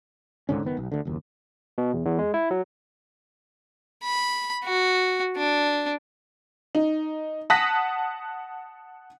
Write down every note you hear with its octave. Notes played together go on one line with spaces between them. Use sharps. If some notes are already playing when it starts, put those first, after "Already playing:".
C#2 G#2 D3 C#4
F#1 D#3 B3
B1
D2 D3
F#1 D#2
B2
E2
E2
G#3
E4
F#3
B5
F#4
D4
D#4
F#5 A5 D#6 F#6 A#6 B6